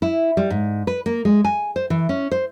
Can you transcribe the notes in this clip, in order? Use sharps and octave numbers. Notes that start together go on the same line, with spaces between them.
E4
G3
G#2
B4
A#3
G#3
G#5
C5
E3
C#4
C5